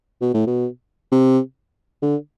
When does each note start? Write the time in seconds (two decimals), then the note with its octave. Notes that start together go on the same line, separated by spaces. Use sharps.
0.21 B2
0.34 A2
0.47 B2
1.11 C3
2.02 D3